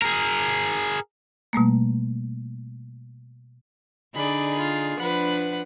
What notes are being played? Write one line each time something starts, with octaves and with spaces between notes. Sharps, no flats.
G#4 A#4
B2 G3 A3 A#3
D3 D#4 G#4 D5 B5
F4
F3 D4 B4 F#5 B5